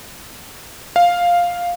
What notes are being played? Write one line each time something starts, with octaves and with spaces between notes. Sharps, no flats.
F5